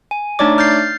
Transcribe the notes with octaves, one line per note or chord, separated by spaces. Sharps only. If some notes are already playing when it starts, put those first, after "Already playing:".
G#5
A3 D4 D#4 C#5 D5 D6
F6 G6 A6 C7